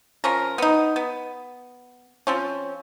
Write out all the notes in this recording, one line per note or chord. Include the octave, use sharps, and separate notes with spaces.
F3 C#4 A#4
B3 D#4
B3
F3 C4 C#4